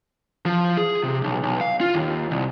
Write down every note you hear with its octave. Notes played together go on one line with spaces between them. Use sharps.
F3
G#4
C3
B1
B1
F5
F4
D#2
C2